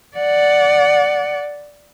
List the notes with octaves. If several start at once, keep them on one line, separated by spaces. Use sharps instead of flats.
D5 F#5